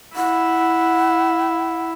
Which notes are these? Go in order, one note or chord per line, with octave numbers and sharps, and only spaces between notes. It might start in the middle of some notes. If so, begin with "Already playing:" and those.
E4 F#5